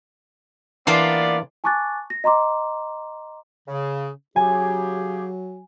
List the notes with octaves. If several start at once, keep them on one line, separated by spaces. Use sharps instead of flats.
E3 A#3 B3 D4 F4 D5 C6
G#5 A5 C#6 D6 F#6 A6
A#6
D#5 A#5 C6 D6
C#3
C#3 F#3 G4 G#4 G#5